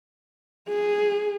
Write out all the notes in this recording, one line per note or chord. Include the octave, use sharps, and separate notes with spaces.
G#4